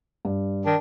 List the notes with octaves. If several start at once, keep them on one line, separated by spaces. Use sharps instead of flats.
G2
D#3 D4